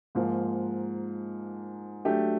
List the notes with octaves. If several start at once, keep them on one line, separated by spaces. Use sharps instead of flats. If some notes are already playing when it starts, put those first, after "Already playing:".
G#2 F3 A#3
F#3 A3 D4 G4